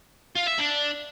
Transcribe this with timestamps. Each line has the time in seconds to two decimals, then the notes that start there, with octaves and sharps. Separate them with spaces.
0.36 F4
0.48 E5
0.59 D4